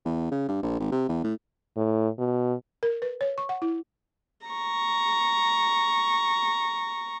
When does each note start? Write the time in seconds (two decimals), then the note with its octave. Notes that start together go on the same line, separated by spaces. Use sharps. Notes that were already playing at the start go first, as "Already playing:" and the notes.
0.05 E2
0.31 C#3
0.48 G2
0.63 A#1
0.80 G#1
0.91 C3
1.09 E2
1.24 A2
1.77 A2
2.19 B2
2.83 A#4
3.02 B4
3.21 C#5
3.38 C#6
3.49 F#5
3.62 E4
4.46 A#5 C#6